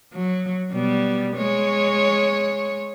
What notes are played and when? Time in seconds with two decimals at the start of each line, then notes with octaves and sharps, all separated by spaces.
0.13 F#3
0.71 B2 G3 B3
1.36 G#3 C#5